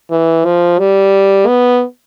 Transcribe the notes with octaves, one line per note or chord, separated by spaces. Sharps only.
E3
F3
G3
B3